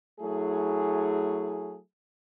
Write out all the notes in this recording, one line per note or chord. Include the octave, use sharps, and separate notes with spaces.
F#3 A3 E4 G#4